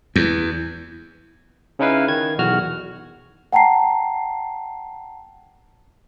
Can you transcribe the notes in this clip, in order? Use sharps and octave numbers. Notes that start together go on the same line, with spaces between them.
E2
C#3 C#4 D#4 E4 B4 F5
D#3 G#6
B1 E2 F#4 F6
F#5 G5 A5 A#5 C7